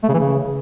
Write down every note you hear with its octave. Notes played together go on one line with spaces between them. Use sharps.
A3
C#3
E3
C#3